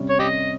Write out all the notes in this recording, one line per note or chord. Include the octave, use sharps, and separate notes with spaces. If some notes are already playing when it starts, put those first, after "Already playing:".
Already playing: C3 G3 C#4
C#5
C#4 G4 D#5